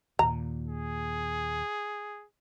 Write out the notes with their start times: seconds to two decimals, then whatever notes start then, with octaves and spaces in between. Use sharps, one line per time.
0.19 D#2 A#2 A#5
0.67 G#4